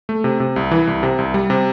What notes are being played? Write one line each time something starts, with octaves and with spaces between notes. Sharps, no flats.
A3
C3
C3
C2
E3
C2
C3
C2
G3
C3